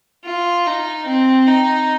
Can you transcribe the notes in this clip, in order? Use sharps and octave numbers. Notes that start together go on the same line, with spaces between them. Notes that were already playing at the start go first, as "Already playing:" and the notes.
F4
D#4
C4
D#4